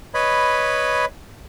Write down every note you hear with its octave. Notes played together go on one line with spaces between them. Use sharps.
B4 C#5 D#5 B5